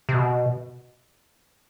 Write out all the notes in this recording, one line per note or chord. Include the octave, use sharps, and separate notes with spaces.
C3
B2